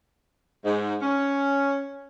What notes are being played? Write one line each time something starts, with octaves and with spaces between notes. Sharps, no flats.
G#2
C#4